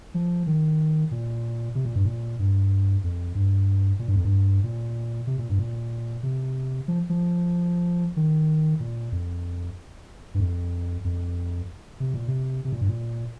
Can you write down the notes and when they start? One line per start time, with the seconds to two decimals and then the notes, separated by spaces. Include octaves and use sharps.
0.14 F3
0.47 D#3
1.11 A#2
1.75 C3
1.85 A#2
1.96 G2
2.05 A#2
2.39 G2
3.04 F2
3.35 G2
3.99 A#2
4.08 G2
4.16 F2
4.25 G2
4.64 A#2
5.27 C3
5.38 A#2
5.49 G2
5.59 A#2
6.23 C3
6.88 F3
7.09 F3
8.17 D#3
8.80 A#2
9.12 F2
10.34 G2
10.40 F2
11.04 F2
12.00 C3
12.14 A#2
12.28 C3
12.65 C3
12.72 A#2
12.81 G2
12.89 A#2